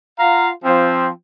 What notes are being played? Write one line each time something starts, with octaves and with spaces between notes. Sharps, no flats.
F4 F5 F#5 A#5
F3 C4